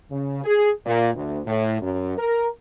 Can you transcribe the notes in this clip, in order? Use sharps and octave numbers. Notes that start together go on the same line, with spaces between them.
C#3
G#4
A#2
D2
A2
F#2
A#4